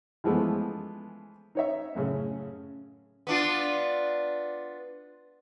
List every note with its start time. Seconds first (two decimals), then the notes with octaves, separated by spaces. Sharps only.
0.24 E3 F3 G#3 A3 B3
1.55 D#4 C#5 E5
1.95 F#2 A2 C#3 C#4
3.27 B3 D4 F4